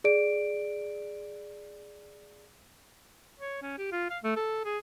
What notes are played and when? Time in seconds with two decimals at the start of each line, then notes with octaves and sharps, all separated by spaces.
0.04 G#4 D5 D7
3.40 C#5
3.62 C#4
3.78 G4
3.92 F4
4.10 F5
4.23 A3
4.36 A4
4.65 G#4